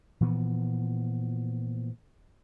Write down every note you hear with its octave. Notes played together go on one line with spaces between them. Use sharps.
A#2 E3 F3 B3